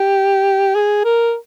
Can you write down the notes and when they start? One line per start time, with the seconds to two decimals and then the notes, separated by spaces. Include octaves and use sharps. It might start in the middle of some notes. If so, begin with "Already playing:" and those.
Already playing: G4
0.75 G#4
1.04 A#4